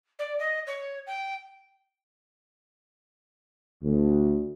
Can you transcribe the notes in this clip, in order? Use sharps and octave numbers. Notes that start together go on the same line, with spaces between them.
D5
D#5
C#5
G5
D2